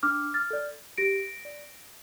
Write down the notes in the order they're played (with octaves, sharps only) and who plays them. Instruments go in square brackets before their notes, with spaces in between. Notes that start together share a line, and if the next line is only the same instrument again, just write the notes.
[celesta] D4 D6 F6
F6 A6
A4 D5
G4 A#6 D7
D5